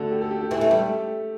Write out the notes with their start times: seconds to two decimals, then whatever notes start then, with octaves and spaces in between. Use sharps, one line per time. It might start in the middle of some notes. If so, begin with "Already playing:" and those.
Already playing: D2 D3 F#4 A4
0.11 G4
0.21 A4
0.31 G4
0.41 G4
0.51 E2 E3
0.60 A3 A4
0.71 G3 G4
0.81 A3